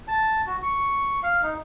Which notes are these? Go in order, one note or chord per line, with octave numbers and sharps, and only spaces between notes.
A5
F#4
C#6
F5
D#4